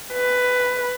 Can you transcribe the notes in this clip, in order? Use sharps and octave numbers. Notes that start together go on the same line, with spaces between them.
B4